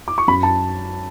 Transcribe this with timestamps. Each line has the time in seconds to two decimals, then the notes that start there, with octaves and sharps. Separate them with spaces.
0.08 D6
0.18 C#6
0.28 F#2 B5
0.43 A5